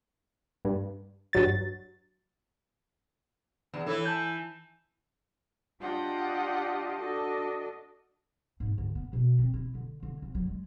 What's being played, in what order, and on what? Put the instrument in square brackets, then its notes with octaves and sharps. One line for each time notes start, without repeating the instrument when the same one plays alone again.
[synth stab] G2
G2 F#3 A6
[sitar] E2
[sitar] E3 E4 [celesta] A4 C#5
[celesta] G#5 A5 G6
[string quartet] D4 F4 G4 D#5 F#5 G5
D4 F#4 A4 D#5
[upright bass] G#2
D2
B3
B2
C4
E4
D3
D3
C2
F#3
G#3